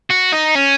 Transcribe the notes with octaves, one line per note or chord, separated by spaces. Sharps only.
F#4
D#4
C#4